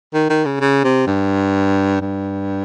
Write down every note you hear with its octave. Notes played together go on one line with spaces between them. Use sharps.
D#3
D#3
C#3
C#3
C3
G2
G2